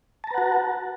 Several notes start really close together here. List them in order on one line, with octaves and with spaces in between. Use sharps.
A5 A#5 B4 F#5 F#4